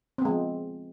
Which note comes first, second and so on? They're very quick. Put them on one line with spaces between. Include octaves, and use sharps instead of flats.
C4 B3 G#3 F3